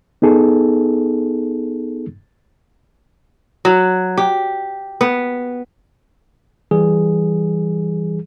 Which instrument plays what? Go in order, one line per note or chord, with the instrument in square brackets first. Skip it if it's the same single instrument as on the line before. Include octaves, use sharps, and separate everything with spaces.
[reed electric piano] B3 D#4 G#4 A4
[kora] F#3
G4
B3
[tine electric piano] E3 G3 G#4